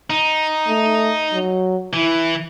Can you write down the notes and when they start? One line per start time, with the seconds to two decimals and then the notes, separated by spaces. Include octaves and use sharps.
0.10 D#4
0.68 A3
1.33 F#3
1.93 E3 E4